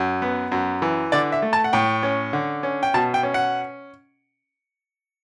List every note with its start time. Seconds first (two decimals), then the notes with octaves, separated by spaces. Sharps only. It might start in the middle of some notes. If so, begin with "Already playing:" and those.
Already playing: F#2
0.22 B3
0.52 F#2
0.82 E3
1.12 D3 D5
1.32 E5
1.42 A3
1.53 A5
1.64 F#5
1.73 A2 G5
2.03 C#4
2.33 D3
2.63 C#4
2.83 G5
2.94 B2 A5
3.14 G5
3.23 C#4
3.34 F#5